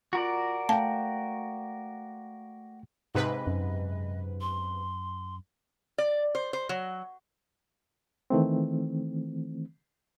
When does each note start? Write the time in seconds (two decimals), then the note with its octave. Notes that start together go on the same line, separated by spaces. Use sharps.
0.13 F4 F#4 A#4 D5
0.69 A3 F5 G5 A5
3.15 G#2 C3 B4 D#5
3.47 F#2
4.41 C6
5.98 D5
6.35 C5
6.53 C5
6.69 F#3
8.30 D#3 E3 A3 C4